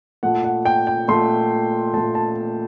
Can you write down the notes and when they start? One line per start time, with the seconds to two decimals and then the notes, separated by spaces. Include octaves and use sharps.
0.23 A#2 A3 F#5
0.44 F#5
0.65 G5
0.87 G5
1.08 A#2 A3 C6
1.94 A#2 A3 A5
2.15 A5